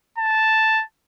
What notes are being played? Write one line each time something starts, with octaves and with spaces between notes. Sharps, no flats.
A5